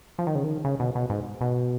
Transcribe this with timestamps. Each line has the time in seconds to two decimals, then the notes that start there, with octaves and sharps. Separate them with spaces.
0.19 F3
0.27 D#3
0.35 C#3
0.44 D#3
0.65 C#3
0.80 B2
0.95 B2
1.10 G#2
1.41 B2